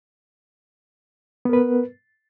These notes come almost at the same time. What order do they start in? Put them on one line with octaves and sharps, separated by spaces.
B3 A#4 B4